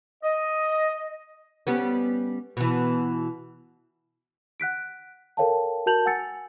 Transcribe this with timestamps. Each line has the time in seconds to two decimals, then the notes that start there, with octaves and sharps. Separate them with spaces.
0.24 D#5
1.67 G3 B3 C#4
2.57 B2 E3
4.60 F#5 F#6 B6 D7
5.37 A4 A#4 C#5 F5 G5 A5
5.86 F#4 A#4 A5 G6 F7 F#7
6.06 F#5 G#5 E6 A6 C#7